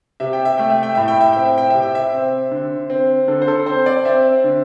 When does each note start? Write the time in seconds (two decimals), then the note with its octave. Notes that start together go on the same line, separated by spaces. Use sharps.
0.20 C3 E5
0.33 G5
0.45 E5
0.58 A3 G5
0.70 E5
0.83 G5
0.95 A2 E5
1.08 G5
1.21 E5
1.33 C4 G5
1.45 E5
1.58 G5
1.70 C3 E5
1.82 G5
1.95 E5
2.13 C4
2.51 D3
2.90 C4
3.28 D3 A4
3.42 C5
3.48 A4
3.66 C4 C5
3.86 D5
4.05 C4 E5
4.44 D3